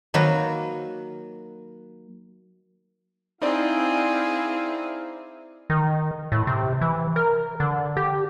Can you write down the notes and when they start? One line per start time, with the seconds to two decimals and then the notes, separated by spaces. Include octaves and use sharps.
0.14 D#3 F#3 A#3 B4
3.42 C4 D#4 E4 G#4 C5 D5 F5
5.70 D#3
6.32 A2
6.47 C3
6.81 E3
7.16 A#4
7.60 D3
7.97 G4